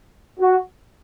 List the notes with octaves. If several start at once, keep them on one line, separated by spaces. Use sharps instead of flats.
F#4